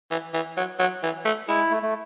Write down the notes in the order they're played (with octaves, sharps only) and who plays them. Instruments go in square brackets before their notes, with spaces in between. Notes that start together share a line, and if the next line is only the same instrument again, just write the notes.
[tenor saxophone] E3
E3
F#3
F#3
E3
A3
[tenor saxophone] G#3 [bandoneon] E4
[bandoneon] A3
A3